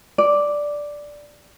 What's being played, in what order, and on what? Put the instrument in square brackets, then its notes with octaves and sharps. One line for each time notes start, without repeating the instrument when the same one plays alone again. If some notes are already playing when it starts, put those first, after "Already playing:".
[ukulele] D5